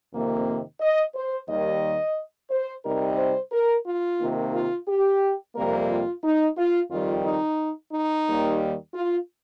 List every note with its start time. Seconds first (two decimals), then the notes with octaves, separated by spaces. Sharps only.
0.13 F2 C3 D#3 A#3
0.81 D#5
1.15 C5
1.49 D#2 D#3 G3 D#5
2.51 C5
2.85 C3 G3 D#4 A#4
3.18 C5
3.52 A#4
3.87 F4
4.19 C3 D#3 A#3 D#4
4.54 F4
4.88 G4
5.55 F2 C3 G3 A#3 A#4
5.90 F4
6.24 D#4
6.58 F4
6.91 F2 D#3 G3 F4
7.24 D#4
7.93 D#4
8.27 D#2 D#3 G3 A#3
8.94 F4